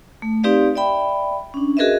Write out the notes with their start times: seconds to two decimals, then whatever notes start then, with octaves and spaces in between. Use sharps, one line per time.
0.22 A3
0.43 C4 D#4 G4 B4 D5 F5
0.76 D5 E5 G5 B5
1.54 C#4 D4
1.77 F#4 G#4 A#4 B4 D#5 E5